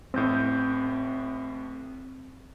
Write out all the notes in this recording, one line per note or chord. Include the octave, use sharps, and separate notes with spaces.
A1 A2 C4 G6